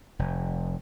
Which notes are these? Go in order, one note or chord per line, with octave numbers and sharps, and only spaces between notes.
F1